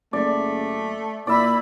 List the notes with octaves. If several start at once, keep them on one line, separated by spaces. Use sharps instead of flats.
F#1 A3 D5
A#2 E4 D5 E5 B5